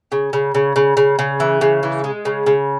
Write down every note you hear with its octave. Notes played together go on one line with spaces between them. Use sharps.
C#3
C#3
C#3
C#3
C#3
C#3
E3
C#3
E3
G#3
C#3
C#3